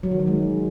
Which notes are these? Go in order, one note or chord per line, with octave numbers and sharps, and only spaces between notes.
F#3
D#3
F#3
G#3